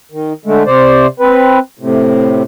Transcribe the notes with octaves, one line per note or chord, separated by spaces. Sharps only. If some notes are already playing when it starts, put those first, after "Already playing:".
D#3
D3 G#3 A3
C3 C5 D5
C4 B4
A2 C3